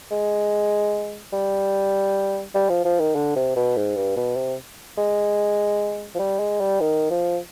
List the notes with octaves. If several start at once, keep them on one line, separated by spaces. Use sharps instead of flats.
G#3
G3
G3
F3
F3
D#3
D3
C3
B2
G#2
G2
B2
C3
G#3
F3
G3
G#3
G3
D#3
F3